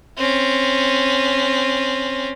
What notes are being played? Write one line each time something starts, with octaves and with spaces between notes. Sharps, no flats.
C4 C#4